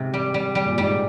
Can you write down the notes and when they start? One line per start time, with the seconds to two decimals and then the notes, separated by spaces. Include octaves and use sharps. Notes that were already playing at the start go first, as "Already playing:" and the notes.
Already playing: G#2 C3 C4
0.14 G3
0.34 G3
0.55 G3
0.66 A#2
0.78 G#2 G3